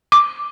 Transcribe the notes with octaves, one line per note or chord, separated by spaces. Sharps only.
D6